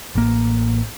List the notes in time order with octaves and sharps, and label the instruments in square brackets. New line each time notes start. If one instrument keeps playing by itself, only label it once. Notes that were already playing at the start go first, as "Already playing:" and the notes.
[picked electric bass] A1 A#3